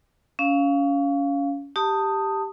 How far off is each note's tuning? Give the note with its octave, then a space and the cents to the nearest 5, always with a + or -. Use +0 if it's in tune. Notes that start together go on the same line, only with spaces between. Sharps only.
C#4 +25 F5 +0
G4 +0 A5 +20 D#6 +0